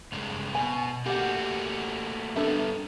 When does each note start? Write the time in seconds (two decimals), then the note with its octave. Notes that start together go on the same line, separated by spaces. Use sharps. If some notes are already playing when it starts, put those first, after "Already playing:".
0.12 G2 C#3 G#3
0.55 B2 G#5
1.06 A3 A#3 F#4 G4 F#5
2.36 G3 B3 D4 A4 E5